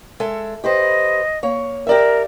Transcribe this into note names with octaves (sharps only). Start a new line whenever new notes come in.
G#3 A4 E5
G4 B4 C5 D#5
A#3 C#5
G4 A#4 D5 E5